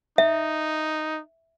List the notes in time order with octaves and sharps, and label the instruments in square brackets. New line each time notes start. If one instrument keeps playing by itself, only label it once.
[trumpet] D#4 [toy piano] E5